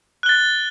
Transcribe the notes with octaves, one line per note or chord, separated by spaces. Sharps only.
F#6 A6 G7